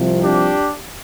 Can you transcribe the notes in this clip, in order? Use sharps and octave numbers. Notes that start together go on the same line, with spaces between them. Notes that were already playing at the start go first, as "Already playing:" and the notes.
Already playing: C2 C3 F3
D4 G4